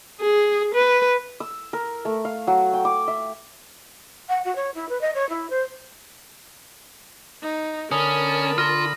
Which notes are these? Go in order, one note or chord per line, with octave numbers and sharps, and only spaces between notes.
G#4
B4
E6
A#4
A3
F5
F#3
G5
D6
E5
F#5
F#4
C#5
E4
B4
D#5
C#5
E4
C5
D#4
D3 C#4 A#4 A5 B5 D#6
F4 C6 F6 A#6